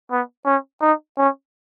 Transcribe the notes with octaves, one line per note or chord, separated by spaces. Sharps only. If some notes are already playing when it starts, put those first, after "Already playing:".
B3
C#4
D#4
C#4